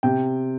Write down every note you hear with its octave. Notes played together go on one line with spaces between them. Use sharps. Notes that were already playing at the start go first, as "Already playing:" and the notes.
C3 G5